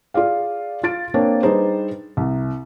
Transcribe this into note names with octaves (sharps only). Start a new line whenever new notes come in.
F4 G#4 D5 F5
F4 A6 D7
A#3 C4 D4 C#5
G3 D4 D#4 G#4 B4 C5
C2